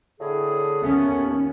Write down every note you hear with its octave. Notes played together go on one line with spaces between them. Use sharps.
A2 D3 G#4
D#2 A3 B3 C#4